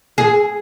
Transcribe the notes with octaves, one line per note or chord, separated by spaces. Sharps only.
G#4